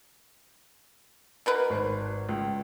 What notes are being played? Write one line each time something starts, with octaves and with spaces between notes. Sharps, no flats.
B2 A#4 B4
G#1 C5
C#2